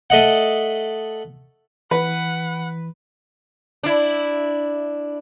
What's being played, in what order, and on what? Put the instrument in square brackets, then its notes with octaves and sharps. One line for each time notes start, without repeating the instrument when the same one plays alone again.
[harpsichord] A3 D#5 F#5
[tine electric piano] E3 [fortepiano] B4 [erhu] F#5
[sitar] D4 E4